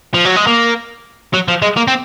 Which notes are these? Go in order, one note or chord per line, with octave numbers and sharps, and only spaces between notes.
F3
F#3
G#3
A#3
F#3
F3
G#3
A#3
C4